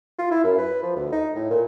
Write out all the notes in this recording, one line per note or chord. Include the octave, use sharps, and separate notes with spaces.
F4
E4
F#2
B4
F3
D2
D#4
A2
A#2